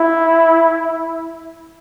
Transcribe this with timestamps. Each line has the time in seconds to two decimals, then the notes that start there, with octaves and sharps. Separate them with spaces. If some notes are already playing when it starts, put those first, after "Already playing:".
Already playing: E4